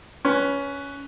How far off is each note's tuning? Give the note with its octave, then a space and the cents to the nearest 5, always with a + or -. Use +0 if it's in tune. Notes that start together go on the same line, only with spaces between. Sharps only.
C#4 +15 B4 +0